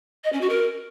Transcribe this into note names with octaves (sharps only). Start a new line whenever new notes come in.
D#5
C#4
F#4
A#4